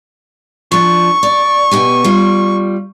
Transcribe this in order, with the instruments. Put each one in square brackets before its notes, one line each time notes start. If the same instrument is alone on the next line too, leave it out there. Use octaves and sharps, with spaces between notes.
[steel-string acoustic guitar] F3 D4 [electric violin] C#6
[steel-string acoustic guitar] D5
B2 G4 G#5
G3 F4